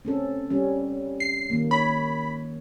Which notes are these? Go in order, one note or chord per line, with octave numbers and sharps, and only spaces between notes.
C4 C#4 A4
G3 C#4
C7
D#3 A#3
C#5 B5